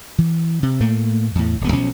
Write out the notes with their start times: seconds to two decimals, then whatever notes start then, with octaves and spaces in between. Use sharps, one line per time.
0.18 E3
0.63 C3
0.80 A2 A3 A#3
1.35 E2 A2
1.61 D1 B3
1.72 B1 B2 F3 C#4